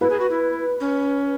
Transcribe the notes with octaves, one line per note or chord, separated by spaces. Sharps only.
E4 B4
G#4
F#4
E4
C#4